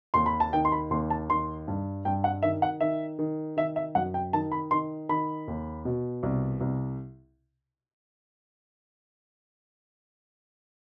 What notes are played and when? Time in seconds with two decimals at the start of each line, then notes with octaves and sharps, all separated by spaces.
0.14 D#2 C6
0.26 B5
0.40 A5
0.53 D#3 G5
0.65 C6
0.72 B5
0.91 D#2 C6
1.10 A5
1.29 D#3 C6
1.68 G2
2.05 G2 G5
2.24 F#5
2.43 D#3 E5
2.62 F#5
2.81 D#3 E5
3.19 D#3
3.57 D#3 E5
3.76 E5
3.95 F#2 F#5
4.14 G5
4.33 D#3 A5
4.52 B5
4.71 D#3 C6
5.09 D#3 B5
5.48 D#2
5.85 B2
6.23 C2
6.61 C2